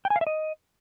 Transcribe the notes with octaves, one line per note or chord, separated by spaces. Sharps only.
G5
G#5
F5
E5
D#5